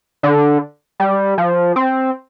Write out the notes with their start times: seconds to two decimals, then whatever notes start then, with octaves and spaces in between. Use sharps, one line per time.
0.23 D3
1.00 G3
1.38 F3
1.76 C4